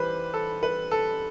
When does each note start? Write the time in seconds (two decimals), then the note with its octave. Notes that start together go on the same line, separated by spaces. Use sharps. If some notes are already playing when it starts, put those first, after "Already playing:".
Already playing: E3 G3 B4 C5
0.34 A4
0.63 B4
0.91 A4